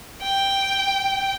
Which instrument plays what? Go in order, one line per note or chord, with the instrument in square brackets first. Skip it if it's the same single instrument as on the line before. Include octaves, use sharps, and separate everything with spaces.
[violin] G5